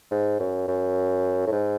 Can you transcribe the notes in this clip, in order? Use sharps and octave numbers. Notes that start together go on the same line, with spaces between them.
G#2
F#2
F#2
A2
G#2